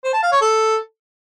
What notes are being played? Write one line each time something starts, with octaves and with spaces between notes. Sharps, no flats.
C5
A5
F5
C#5
A4